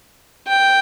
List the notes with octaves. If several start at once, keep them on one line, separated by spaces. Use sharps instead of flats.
G5